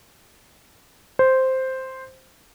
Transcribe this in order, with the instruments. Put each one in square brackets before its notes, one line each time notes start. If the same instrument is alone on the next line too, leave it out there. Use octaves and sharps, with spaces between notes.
[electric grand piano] C5